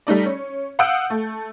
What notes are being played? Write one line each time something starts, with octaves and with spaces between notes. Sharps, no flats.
G3 A3 D#4 D5
C#4
F5 F#5 D#6 E6 G6 D7
A3